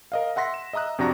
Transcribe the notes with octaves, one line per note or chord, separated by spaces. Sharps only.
A#4 D#5 F5
E5 F#5 C6 A#6 B6
E7
D#5 E5 A#5 D#6 F#6
F2 C3 D4 F#4 A#5 A#6